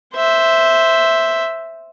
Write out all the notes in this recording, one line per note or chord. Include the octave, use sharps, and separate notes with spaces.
C5 E5